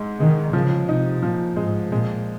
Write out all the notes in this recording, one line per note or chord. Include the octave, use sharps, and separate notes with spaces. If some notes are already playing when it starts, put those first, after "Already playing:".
Already playing: G#2 G#3
D#3 G#3
C#3 F3
C3 D#4
A#2 F3
G#2 G#3
A#2 G#3